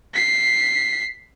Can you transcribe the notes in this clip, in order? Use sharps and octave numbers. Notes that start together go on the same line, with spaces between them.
B6 C7